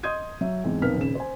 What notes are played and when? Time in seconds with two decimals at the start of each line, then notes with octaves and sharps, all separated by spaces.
0.03 D#5 C6 D#6 G6 G#6 D#7
0.41 F#3 E5
0.64 E2 G#2 C4
0.82 F1 B1 A#4 B4 F6 B6
0.97 D#1 C#3 E7
1.15 C5 G#5